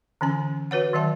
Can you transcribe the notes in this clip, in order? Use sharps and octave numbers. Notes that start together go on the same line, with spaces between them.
D3 E3 C#4 A#5
F#4 B4 C#5 F#5
D#3 F#3 E5 A5